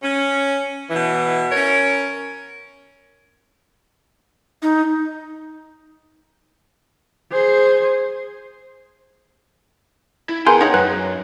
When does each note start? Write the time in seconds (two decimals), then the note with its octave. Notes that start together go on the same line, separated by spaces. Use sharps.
0.02 C#4
0.90 B2 E3
1.52 C#4 A#4 C#5
4.62 D#4
7.32 G#4 C5
10.29 E4
10.46 B3 G#4 A#4 F5 G5 G#5 C6 G6
10.61 D#4 C#5 F#5
10.74 F#2 B4 F#6